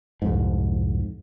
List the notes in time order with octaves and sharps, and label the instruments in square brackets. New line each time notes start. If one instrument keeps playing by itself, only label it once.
[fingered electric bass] C2 F2 G#2